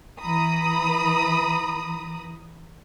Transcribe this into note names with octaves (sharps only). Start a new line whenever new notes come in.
E3 A#5 B5 D#6